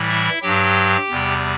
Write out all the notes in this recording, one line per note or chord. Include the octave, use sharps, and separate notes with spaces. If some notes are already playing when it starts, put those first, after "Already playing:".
Already playing: A2 E3 G3
E4 E5
G2 F#3 G4 G5
E2 C3 G3